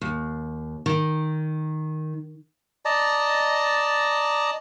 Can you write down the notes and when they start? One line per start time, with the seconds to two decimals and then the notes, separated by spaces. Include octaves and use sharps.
0.01 D#2
0.86 D#3
2.85 D5 D#5 A5 A#5